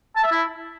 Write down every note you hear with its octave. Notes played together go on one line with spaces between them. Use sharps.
A5
E5
E4